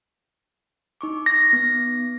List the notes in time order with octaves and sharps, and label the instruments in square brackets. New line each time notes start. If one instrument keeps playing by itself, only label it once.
[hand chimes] D#4 C#6 D6
[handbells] A#6
[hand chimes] B3